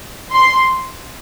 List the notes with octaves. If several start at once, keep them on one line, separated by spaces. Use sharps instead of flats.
C6